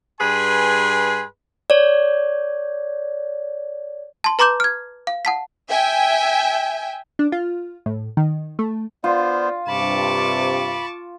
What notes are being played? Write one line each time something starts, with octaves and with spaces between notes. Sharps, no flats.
G2 G#4 B4 G#5 C6
C#5 D5
A5 C6
B4 A#5 C6 D6 G6 E7
F6 G#6
F5
F#5 A5 B6
E5 G5 G#5
D4
F4
A2
D#3
A3
B3 F4 C5 D5
G2 C3 A5 B5 C#6 D6